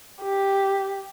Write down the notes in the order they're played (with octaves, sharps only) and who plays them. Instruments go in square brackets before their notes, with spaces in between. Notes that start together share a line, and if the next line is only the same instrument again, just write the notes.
[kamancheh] G4